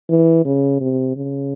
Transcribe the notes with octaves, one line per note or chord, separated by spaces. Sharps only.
E3
C#3
C3
C#3